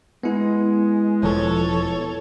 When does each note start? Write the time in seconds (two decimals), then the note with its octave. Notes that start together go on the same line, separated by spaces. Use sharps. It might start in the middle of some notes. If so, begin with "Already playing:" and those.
0.23 G#3 B3 E4
1.23 E1 F3 A4 C#5